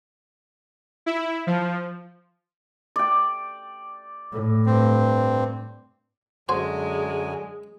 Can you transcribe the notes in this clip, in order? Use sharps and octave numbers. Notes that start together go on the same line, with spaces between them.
E4
F3
D5 G5
A2
G2 C4
F#2 D3 G#3 F#4 C5 G#5